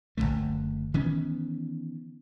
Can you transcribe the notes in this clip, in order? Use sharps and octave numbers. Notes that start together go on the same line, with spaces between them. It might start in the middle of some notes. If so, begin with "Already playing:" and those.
F#1 C#2 D3 A3
D#3 E3 B3 C#4